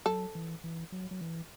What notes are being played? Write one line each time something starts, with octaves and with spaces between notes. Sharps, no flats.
F#3 A4
E3
E3
F#3
F#3
E3